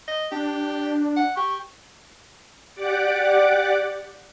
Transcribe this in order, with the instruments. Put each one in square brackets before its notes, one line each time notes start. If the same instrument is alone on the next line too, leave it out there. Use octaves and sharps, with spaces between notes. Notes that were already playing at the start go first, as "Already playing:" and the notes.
[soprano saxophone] D#5
[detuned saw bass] D4 [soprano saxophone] G4
[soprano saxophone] F#5
[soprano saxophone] G4 [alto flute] C#6
[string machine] G4 D5 F#5 D6